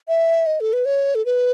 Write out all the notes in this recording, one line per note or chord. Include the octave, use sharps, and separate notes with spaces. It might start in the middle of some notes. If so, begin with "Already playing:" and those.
E5
D#5
A4
B4
C#5
A4
B4